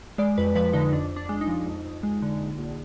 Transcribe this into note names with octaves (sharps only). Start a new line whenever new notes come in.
G#3 D5
F2 B4
F3 B4
D3 D#4
F2 D4
F2
D4
G#3
D#4
F3
F2
F2
G#3
D3
A#1
A#1